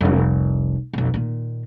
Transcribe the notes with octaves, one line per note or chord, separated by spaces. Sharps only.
F1 C2
B1 F2
A#2 D#3